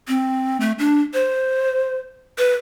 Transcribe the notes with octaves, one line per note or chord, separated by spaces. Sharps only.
C4
A3
D4
C5
B4